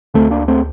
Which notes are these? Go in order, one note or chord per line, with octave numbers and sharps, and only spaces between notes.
D2 D3 A3 C4
A#3 D4
A3 C4